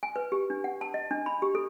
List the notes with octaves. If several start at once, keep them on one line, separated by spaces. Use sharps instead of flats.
G#5
B4
G4
D4
F#5
A5
D#5
D4
B5
G4
A4